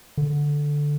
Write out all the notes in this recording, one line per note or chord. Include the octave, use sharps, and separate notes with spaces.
D3